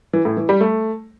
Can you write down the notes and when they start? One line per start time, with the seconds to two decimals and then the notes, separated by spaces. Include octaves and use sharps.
0.13 E3
0.25 A2
0.37 E3
0.49 G3
0.61 A3